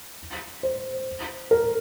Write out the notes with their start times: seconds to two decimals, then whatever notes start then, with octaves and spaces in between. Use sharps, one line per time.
0.63 C5
1.51 A#4